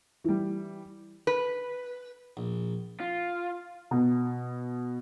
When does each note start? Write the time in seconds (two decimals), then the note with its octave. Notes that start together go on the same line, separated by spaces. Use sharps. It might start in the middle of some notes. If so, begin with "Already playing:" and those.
0.24 E3 G3
1.27 B4
2.37 A#1
3.00 F4
3.91 B2